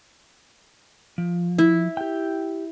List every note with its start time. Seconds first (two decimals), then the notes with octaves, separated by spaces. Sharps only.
1.18 F3
1.58 E4
1.97 G4 G5